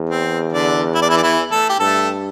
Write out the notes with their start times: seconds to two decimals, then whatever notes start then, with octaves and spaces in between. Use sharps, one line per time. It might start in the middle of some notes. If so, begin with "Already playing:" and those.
Already playing: E2
0.09 C4
0.52 D3 D4
0.95 E4
1.02 D4
1.09 E3 E4
1.17 D4
1.22 E3 E4
1.52 A3 A4
1.69 G4
1.80 G2 A3 A4